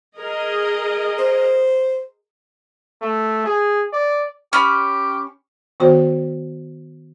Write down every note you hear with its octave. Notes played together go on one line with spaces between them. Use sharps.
G#4 A#4 D#5
C5
A3
G#4
D5
C#4 G4 B5
D#3 B3 F#4 C5 D5 G5